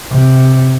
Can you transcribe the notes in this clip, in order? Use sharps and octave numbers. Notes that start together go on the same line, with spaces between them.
C3